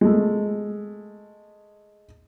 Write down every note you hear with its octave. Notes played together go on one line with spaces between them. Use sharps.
G#3 A3